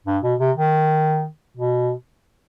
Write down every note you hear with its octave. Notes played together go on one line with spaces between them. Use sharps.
G2
B2
C3
D#3
B2